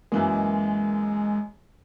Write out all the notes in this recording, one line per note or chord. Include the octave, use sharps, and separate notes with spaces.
F#2 E3 G#3 A#3